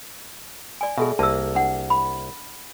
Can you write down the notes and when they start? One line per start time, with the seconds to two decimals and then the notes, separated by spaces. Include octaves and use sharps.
0.81 D5 G#5
0.98 B2 G#4 A4 E5
1.19 C2 A#3 A5 E6
1.55 D4 F#5
1.90 B5